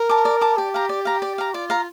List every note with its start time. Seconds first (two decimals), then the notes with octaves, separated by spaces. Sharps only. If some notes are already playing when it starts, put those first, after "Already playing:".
Already playing: A#4
0.09 A5 D6
0.25 D5
0.41 A5 D6
0.57 G4 D5
0.74 F5 A#5
0.89 D5
1.05 F5 A#5
1.22 D5
1.38 F5 A#5
1.54 F4 D5
1.70 F5 A#5